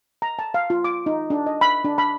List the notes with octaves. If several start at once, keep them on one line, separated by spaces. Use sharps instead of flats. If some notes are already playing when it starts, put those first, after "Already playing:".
A#5
A5
F5
F4
D6
D#4
D4
D#5
B5
D4
B5